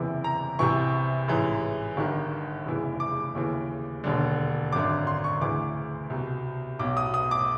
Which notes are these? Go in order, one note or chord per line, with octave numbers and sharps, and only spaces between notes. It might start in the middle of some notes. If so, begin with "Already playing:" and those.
Already playing: F#1 E2 C3 E3
A#5
C2 C3 E3 C#6
A1 G#2 E3
G1 G2 D#3
F1 E2 C#3 E3
D6
D#2 C#3 E3
E1 D#2 D3
G#1 F#2 D3 D6
C6
C#6
D2 C#3 E3 D6
C2 B2
B1 B2 D6
D#6
D#6
D6